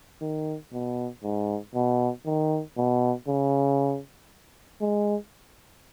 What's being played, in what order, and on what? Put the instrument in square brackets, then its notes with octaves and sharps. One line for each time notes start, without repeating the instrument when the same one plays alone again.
[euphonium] D#3
B2
G#2
B2
D#3
B2
C#3
G#3